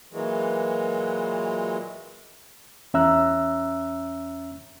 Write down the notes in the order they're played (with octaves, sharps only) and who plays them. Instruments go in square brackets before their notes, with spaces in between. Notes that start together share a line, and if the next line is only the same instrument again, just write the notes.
[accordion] A#2 E3 F#3 G#3
[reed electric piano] E2 C#4 E5 A#5 E6 F#6